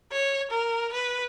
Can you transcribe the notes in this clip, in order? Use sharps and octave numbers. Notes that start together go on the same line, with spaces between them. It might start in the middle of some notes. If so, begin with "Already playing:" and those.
C#5
A#4
B4